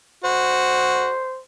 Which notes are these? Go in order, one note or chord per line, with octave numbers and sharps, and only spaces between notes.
F#4 C5